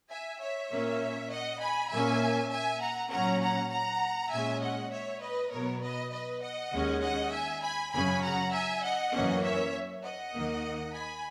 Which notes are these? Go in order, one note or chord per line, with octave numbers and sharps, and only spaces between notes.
E5 G#5
C#5 E5
A#2 A#3 C#4
D#5 F#5
G#5 B5
A#2 A#3 C#4 E5 G#5
E5 G#5
F#5 A#5
A#2 F#3 C#4 F#5 A#5
F#5 A#5
F#5 A#5
A#2 G#3 C#4 E5 G#5
D#5 F#5
C#5 E5
B4 D#5
B2 F#3 B3 A#4 C#5
B4 D#5
B4 D#5
D#5 F#5
D#2 D#3 G#3 C#4
D#5 F#5
E5 G#5
G#5 B5
F#2 C#3 F#3 C#4 G#5 B5
F#5 A#5
E5 G#5
D#5 F#5
F#2 E3 A#3 C#4
C#5 E5
D#5 F#5
D#2 D#3 A#3
G#5 B5